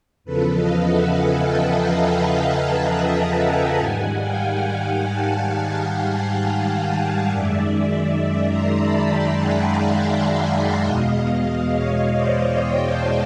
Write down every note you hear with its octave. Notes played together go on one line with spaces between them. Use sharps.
E2 C#3 F3 A4 B4
D#5 F5
E5 F#5
F#5 G#5
G5 A5
G#5 A#5
A5 B5
A5 B5
G5 A5
G#5 A#5
G5 A5
G#2 D#3 G3 F#5 G#5
F5 G5
F#5 G#5
G5 A5
F#2 D#3 G#3 D5 E5
A#5 C6
A5 B5
G5 A5
F#5 G#5
F5 G5
E5 F#5
F5 G5
E2 B2 G#3 D#5 F5
D#5 F5
C#5 D#5
C5 D5
F5 G5
G5 A5